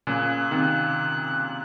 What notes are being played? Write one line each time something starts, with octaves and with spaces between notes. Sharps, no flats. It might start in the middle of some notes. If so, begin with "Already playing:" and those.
A#2 C#3 F#6
C3 D#3